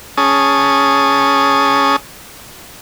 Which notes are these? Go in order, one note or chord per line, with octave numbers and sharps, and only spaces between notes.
C#4 G#4 A5 D#6